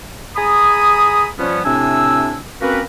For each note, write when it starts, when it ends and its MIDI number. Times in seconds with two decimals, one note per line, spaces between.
0.36 1.28 68
0.36 1.28 80
0.36 1.28 82
0.36 1.28 83
0.36 1.28 87
1.38 1.60 53
1.38 1.60 55
1.38 1.60 59
1.38 1.60 61
1.65 2.37 45
1.65 2.37 48
1.65 2.37 60
1.65 2.37 62
1.65 2.37 80
1.65 2.37 88
2.61 2.81 58
2.61 2.81 60
2.61 2.81 61
2.61 2.81 66
2.61 2.81 70
2.61 2.81 71